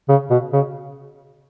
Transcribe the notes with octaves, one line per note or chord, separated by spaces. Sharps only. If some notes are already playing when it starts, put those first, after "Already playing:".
C#3
B2
C#3